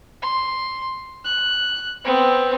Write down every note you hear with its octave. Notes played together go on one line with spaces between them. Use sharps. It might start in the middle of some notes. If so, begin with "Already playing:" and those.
C6
F#6
B3 C4